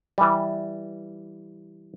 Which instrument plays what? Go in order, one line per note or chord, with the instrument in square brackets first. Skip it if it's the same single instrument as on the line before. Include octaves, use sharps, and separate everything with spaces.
[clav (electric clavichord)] E3 G3